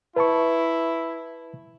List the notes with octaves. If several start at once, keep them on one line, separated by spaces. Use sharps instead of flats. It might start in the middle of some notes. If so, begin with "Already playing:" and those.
E4 B4 A5 C#6